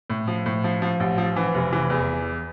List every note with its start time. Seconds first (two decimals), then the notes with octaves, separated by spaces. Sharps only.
0.10 A2
0.28 F3
0.46 A2
0.64 F3
0.82 F3
1.00 A1
1.18 F3
1.36 E3
1.54 F1
1.72 E3
1.90 E2